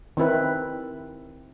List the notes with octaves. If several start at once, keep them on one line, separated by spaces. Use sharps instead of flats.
D#3 C4 E4 B4